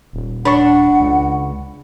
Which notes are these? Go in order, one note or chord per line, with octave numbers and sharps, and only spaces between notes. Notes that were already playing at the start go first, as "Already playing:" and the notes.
D#1
D4 F#5 B5 C#6
C#2